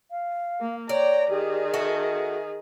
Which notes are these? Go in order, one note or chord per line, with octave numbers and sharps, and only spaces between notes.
F5
A#3
C#5 D5 G5 A#5
D#3 G4 G#4
F#4 A4 E5